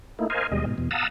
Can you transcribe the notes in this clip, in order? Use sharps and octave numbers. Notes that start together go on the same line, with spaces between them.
A3 A#3 D#4 E4
A#4 C5 D#5 F5 G#5
D#2 B2 G3 G#3 D#5
G#2 B2
E2 B2
F5 F#5 A5 A#5 D#6 E6